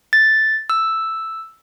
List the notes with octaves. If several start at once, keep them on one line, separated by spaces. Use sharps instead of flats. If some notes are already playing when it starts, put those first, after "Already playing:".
A6
E6